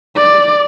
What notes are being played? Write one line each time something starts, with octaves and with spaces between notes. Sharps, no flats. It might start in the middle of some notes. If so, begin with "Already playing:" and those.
D5